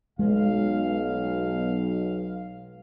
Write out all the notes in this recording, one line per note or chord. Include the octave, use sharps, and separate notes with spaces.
B1 G#3 F5